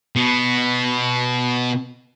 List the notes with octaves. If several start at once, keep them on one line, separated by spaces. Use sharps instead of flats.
B2 B3